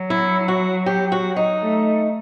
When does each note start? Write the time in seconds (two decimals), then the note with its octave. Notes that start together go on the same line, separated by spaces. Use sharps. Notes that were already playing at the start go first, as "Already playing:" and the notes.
Already playing: F#3
0.10 E4
0.48 F#4
0.86 G4
1.12 F#4
1.36 D#4
1.62 A3